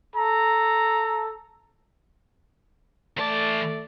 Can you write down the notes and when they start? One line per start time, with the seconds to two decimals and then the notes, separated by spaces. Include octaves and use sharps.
0.15 A4 A#5
3.17 E3 A3 D5 A5